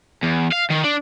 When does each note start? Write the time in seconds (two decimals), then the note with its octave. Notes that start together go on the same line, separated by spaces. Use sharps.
0.23 E2
0.53 F5
0.71 D#3
0.85 D4